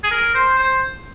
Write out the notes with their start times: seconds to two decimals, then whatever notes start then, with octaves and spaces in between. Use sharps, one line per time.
0.04 G#4
0.11 A#4
0.35 C5
0.59 C5